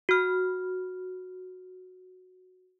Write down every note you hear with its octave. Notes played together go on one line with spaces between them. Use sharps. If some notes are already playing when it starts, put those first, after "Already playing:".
F#4 F6